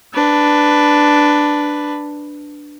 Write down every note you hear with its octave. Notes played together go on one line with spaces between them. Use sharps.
D4 B4